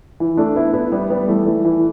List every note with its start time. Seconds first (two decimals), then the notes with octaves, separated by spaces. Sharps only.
0.20 E3
0.37 A3 D4
0.55 B3 E4
0.73 B3 E4
0.92 G3 B3
1.10 G3 B3
1.28 E3 A3
1.46 E3 A3
1.65 E3